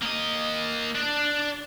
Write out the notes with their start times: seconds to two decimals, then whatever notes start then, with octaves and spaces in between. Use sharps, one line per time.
0.02 A#3 D#5
0.95 D4